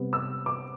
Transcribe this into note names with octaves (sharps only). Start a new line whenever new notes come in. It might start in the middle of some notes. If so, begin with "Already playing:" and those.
Already playing: C3 G3 B3
E6
D6